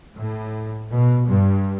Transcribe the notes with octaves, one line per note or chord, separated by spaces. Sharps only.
A2
B2
G2